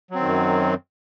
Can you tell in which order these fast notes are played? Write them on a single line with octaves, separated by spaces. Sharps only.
F#3 C4 D#3 F#2